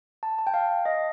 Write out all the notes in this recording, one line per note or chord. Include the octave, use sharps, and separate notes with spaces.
A5
A5
G5
F5
D#5